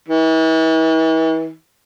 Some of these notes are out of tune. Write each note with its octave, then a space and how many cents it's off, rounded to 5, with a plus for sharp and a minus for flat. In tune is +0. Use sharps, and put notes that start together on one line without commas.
E3 -40